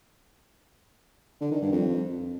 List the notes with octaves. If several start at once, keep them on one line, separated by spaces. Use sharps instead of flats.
D3
D#3
G2
F2